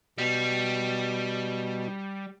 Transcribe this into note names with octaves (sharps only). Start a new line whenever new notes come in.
B2 G3